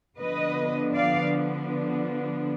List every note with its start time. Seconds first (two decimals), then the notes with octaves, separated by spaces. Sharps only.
0.18 D3 F3 B3 D4 B4 D#5
0.94 D5 F5